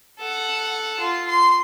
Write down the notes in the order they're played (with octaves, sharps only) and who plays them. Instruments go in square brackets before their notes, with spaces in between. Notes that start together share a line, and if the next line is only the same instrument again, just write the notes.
[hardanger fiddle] A4 F#5
F4
C6